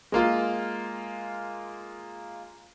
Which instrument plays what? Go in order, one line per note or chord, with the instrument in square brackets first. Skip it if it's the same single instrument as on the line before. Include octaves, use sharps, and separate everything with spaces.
[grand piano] G#3 A#3 F4